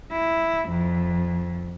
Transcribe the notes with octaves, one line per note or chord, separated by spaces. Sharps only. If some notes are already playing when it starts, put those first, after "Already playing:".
E4
F2